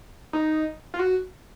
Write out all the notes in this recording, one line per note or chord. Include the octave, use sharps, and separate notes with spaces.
D#4
F4
F#4